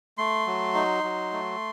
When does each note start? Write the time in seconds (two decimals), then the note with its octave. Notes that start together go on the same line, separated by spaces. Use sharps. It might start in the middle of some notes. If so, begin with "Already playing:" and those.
0.18 A3 C6
0.46 F#3
0.75 D#4
1.03 F#3
1.32 A3